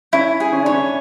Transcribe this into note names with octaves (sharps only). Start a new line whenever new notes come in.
C#4 E4
G#4
C#4
D4 C#5
C#4